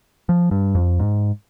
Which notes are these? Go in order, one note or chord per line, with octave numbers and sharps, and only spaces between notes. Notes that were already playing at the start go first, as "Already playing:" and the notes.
F3
G2
F2
G#2